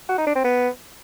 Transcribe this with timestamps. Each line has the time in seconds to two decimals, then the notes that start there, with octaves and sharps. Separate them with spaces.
0.09 F#4
0.18 D#4
0.27 D4
0.36 C4
0.44 B3